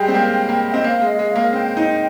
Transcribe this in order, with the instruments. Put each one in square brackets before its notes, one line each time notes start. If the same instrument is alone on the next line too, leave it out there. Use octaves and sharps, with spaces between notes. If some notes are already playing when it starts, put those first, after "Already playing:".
Already playing: [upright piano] G3 G#3 [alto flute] G5
[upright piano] C4
A#3
A#3
[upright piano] C4 [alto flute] D#5
[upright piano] A#3 [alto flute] F5
[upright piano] G#3
[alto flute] D#5
[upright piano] G#3
[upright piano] A#3 [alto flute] F5
[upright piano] C4 [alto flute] G5
[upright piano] D#4